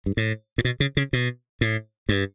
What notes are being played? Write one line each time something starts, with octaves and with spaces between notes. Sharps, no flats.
G2
A2
A2
B2
C#3
C#3
B2
A2
G2